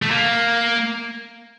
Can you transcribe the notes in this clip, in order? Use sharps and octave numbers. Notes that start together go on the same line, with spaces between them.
A3
A#3